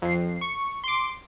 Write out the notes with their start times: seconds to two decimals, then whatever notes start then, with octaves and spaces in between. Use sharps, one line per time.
0.02 F2 C7
0.41 C#6
0.84 C6 D6